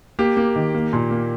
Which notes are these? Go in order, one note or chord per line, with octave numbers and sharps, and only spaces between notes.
A#3 G4
A#3
D#3
A#3
A#2
A#3